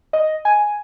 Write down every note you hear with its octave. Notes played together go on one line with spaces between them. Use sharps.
D#5
G#5